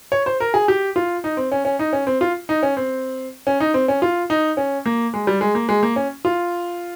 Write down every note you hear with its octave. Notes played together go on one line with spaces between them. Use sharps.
C#5
C5
A#4
G#4
G4
F4
D#4
C4
C#4
C#4
D#4
C#4
C4
F4
D#4
C#4
C4
C#4
D#4
C4
C#4
F4
D#4
C#4
A#3
G#3
G3
G#3
A#3
G#3
A#3
C#4
F4